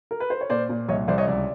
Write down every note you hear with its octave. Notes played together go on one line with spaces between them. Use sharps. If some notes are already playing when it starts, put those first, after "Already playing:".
A#4
B4
C5
C#5
A#2 C5 D5
A#2
C2 C#5 D#5
C2 C5 D5
C#5 D#5
C#2 D5 E5